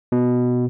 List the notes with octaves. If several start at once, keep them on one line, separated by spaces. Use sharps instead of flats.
B2